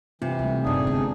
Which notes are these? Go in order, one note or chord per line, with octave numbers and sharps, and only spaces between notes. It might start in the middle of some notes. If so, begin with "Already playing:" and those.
C3 E3 F4
C#2 G3 A3
F#2 A2 D4 D#4 G#4
D3 G#3 B3